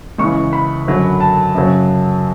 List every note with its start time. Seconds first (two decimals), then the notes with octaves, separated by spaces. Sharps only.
0.18 C#2 C#3 E3 C#6
0.53 B5
0.87 F#2 D3 F#3
1.20 A5
1.55 F#2 C#3 F#3